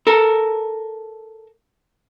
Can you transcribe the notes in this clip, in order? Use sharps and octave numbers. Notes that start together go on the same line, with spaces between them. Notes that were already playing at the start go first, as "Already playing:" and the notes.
A4 A#4